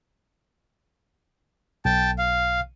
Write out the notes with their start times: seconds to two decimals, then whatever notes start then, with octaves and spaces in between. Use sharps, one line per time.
1.85 B1 G5 A5
2.18 F5